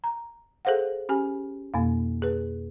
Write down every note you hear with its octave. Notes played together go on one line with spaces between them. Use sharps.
A#5
G#4 A4 C5 F5 F#5
C#4 G4 G#5
F2 B2 A#3
G#4 B4